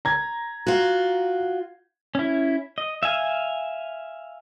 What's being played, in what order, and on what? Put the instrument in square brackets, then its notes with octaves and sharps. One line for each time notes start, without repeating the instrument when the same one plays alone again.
[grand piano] A#5 G#6
[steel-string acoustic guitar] F4 F#4
[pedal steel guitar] C#4 E4
D#5
E5 F5 G#5